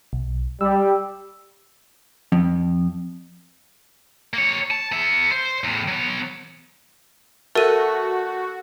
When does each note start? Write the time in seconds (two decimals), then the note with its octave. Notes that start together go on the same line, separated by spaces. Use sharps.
0.13 B1
0.61 G3 E6
2.32 F2
4.34 A#3 C#5
4.71 A5
4.92 B3 E5
5.32 C5
5.64 E2 A2
5.88 F#3 B3
7.55 A3 F#4 A4 A#4 D#7